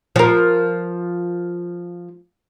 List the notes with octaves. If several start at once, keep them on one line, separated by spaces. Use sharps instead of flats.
F3 A#4